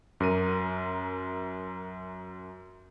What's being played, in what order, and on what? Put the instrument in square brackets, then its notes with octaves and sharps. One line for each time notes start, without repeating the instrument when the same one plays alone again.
[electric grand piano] F#2 A#4 D#7